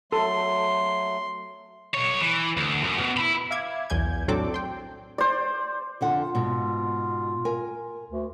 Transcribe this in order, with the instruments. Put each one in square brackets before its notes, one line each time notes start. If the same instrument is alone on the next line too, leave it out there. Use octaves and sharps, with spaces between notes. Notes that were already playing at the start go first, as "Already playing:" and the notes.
[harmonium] F#3 A3 [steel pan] A4 [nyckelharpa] C6
[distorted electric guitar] B1 C#5
E3
D2
F#2
B2
E4 B5
[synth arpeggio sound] E5 F5 D6 G#6
B1 E2 G#5 G6 G#6
A2 F#3 C4 D4 A4 D6
G5 C6
[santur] C5 D5
[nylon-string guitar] F2 D3 F#5 [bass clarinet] F4
[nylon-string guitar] G#2 B2
A#4 G#5
[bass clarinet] D2